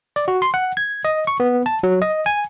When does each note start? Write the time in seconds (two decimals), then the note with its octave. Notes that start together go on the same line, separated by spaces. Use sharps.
0.16 D5
0.28 F#4
0.42 C6
0.54 F#5
0.77 G#6
1.05 D#5
1.27 C#6
1.40 B3
1.66 A5
1.83 F#3
2.02 D#5
2.26 G#5